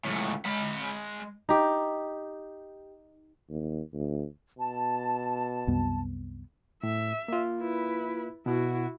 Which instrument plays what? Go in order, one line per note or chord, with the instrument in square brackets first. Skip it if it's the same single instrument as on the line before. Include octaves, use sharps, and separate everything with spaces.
[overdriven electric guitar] C#2 A2
G#3 B5
[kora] D#4 G4
[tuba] D#2
D2
[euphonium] B2 [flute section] A5
[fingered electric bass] C2 F#2 B3
[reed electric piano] A2 [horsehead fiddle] E5
[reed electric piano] A#3 F4
[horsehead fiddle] E4 B4
[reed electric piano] B2 F#5 [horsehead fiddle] E4 F#4